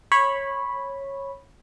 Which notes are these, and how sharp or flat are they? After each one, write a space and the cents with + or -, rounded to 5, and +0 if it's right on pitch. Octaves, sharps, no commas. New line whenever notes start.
C#5 -15 B5 -5